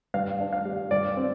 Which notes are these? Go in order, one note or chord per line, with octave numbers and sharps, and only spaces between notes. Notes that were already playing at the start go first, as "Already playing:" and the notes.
G2 F5
D4
F5
G3
G2 D5
C4